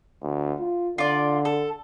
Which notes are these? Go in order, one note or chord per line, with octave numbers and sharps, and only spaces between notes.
D2
F4
D3 F4 D5
A4